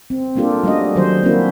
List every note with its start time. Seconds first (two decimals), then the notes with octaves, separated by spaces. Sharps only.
0.10 C4
0.35 G3 A#3 D4 F4 G4 A4
0.64 G3 A3 C#4 F#4 D#5
0.95 D#3 F#3 G3 C5
1.24 A#3 C4 C#4 E4 F#4